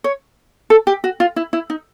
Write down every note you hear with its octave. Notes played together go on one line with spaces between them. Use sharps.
C#5
A4
G4
F#4
F4
E4
E4
D#4